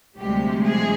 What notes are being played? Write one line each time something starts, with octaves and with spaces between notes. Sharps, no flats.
D2 C3 F3 G3 G#3 G4
G#3 G#4